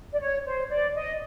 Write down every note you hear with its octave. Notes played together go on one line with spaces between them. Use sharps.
D5
C#5
C5
D5
D#5